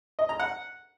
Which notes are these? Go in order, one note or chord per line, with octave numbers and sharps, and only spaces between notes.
D#5
A#5
F#5